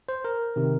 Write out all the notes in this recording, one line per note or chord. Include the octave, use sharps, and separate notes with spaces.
C5
A#4
C3 D#3